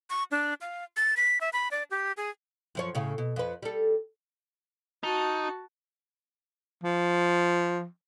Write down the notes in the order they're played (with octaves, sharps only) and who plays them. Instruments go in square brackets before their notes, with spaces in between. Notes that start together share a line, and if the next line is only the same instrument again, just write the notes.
[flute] C#6
D4
F5
A6
B6
E5
B5
D5
G4
G#4
[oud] F#2 F3 C#5
A2 C#3
B2
F2 B4
G3 A4
[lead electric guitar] D#4 [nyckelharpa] F#4 A5
[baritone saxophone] F3